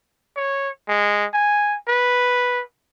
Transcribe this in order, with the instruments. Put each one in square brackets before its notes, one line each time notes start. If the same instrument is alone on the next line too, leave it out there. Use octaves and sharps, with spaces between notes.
[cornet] C#5
G#3
G#5
B4